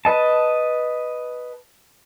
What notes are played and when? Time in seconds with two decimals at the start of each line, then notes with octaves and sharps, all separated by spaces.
0.05 B4 D#5 A5